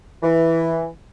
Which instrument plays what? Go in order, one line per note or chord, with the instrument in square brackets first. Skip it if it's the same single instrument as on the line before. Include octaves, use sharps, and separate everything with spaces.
[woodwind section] E3